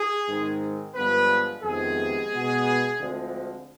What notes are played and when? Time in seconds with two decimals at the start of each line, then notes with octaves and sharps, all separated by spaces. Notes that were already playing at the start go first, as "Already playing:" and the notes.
Already playing: G#4
0.28 G#2 D#3 G#3 C4
0.95 G2 D3 F3 G#3 B3 B4
1.63 F2 C3 D#3 G#3 B3 G#4
2.31 B2 B3
2.99 D2 D3 F3 G#3 C4